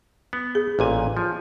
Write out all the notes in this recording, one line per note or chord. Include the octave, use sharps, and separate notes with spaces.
B3
G#4
A1 A#2 G#5
F3